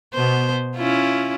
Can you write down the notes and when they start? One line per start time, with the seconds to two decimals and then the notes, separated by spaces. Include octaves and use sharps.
0.14 B2 B3 C5
0.76 C#4 E4 F4